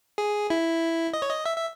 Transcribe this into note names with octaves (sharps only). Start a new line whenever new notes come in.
G#4
E4
D#5
C#5
D#5
E5
E5